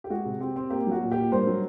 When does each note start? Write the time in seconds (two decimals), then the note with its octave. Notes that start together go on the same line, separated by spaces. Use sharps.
0.04 G4
0.10 G#3 F#4 G#4
0.25 C3
0.40 C4 G4
0.56 C4
0.70 A#3 G4
0.87 F#3 F#4
1.01 A#2
1.12 A#2 G4
1.32 G2 A#4 C5
1.47 F#3